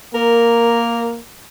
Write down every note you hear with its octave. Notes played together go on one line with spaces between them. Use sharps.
A#3 A#4